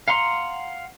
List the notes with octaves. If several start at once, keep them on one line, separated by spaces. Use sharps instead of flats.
F5 F#5 A#5 C6